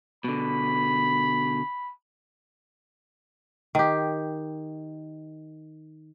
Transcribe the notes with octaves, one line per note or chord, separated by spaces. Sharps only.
B2 D3 B5
D#3 G4